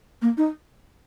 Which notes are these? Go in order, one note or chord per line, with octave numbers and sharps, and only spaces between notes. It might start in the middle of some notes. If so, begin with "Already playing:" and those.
A#3
D#4